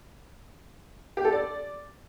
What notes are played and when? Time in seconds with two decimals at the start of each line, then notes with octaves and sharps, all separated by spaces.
1.17 G4
1.25 A4
1.32 D5